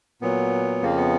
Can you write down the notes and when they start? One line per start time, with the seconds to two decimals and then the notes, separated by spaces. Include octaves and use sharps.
0.22 A#2 F#3 B3
0.82 F2 C#3 F3 A#3
0.97 B3